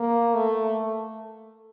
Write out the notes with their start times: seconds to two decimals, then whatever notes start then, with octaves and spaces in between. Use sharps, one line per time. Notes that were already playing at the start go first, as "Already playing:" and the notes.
Already playing: A#3
0.34 A3